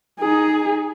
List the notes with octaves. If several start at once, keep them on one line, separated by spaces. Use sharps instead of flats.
D#4 G#4